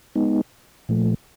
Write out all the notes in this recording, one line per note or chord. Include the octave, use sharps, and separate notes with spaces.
G#3 B3 D#4
A#2 F3 A3